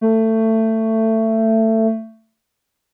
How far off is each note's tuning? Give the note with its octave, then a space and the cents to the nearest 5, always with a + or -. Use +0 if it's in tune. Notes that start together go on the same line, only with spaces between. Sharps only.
A3 +20